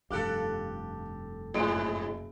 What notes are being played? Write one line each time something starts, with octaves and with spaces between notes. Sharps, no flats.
F1 G2 G4 A4 F5 F#6
F#1 G#2 G#3 D7